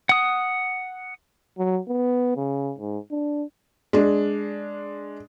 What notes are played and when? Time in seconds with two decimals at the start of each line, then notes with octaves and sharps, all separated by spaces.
0.09 F#5 D#6
1.58 F#3
1.88 B3
2.36 C#3
2.78 G#2
3.11 D4
3.93 G#3 D4